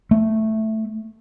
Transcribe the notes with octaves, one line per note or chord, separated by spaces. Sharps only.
A3